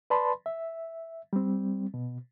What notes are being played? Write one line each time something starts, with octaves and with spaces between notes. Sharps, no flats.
B4 D5 A5 B5 C6
E5
G3 C4
B2